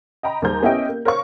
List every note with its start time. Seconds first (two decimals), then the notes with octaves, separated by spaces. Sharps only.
0.23 D#5 G5 A#5 B5
0.42 D#2 G3 G#4 C5 A#5 G6
0.62 B3 C#4 E4 G4 D#5 G5
0.89 A#3
1.05 A#4 C5 C#5 F5 C#6